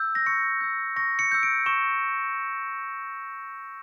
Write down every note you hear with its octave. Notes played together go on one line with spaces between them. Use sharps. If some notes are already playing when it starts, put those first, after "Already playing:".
Already playing: E6 G6
A#6
C#6 C#7
E6 G6
C#6 A#6
C#7
E6 G6
D7
C#6 E7